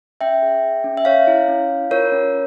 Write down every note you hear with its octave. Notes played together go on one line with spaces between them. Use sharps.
C#4 E5 G5
G#4
G#4
C#4
E5
C#4 C#5 F5
E4
C#4
E4
F4 A#4 C#5
C#4